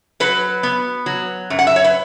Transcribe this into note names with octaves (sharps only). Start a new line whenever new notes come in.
F#3 B4
B3
F#3
F#2
F#5
E5
C#5
B4